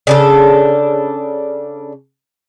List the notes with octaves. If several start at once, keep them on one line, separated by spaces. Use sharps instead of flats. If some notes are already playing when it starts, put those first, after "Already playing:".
C#3 D4 A4